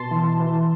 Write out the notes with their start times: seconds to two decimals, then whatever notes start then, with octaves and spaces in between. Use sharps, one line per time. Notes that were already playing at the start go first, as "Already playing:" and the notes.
Already playing: B2 A5 C6
0.11 E3
0.40 E3